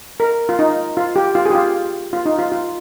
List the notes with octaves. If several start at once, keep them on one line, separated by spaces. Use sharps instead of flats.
A#4
F4
D#4
F4
G4
F4
G#4
G4
F4
F4
D#4
F4
F4